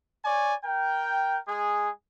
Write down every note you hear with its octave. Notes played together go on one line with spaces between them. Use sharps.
C#5 D5 G#5
A#4 G5
G#3 G#4